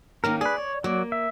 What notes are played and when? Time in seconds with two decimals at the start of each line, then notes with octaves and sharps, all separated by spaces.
0.24 D#3 A#3 C#4 A#4
0.41 G#4 B4 D5
0.58 C#5
0.84 F#3 A#3 D5
1.12 E5